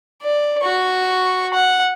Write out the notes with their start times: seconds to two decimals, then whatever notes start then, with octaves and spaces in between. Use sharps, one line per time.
0.22 D5
0.63 F#4 C#6
1.54 F#5